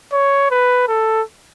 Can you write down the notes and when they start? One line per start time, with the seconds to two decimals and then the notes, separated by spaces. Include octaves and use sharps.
0.12 C#5
0.51 B4
0.88 A4